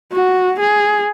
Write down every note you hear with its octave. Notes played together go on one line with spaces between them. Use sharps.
F#4
G#4